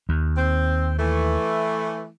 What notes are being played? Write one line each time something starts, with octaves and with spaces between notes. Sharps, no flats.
D#2
C4
E3 A3